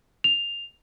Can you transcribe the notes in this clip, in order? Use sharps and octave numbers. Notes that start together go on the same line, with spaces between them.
F7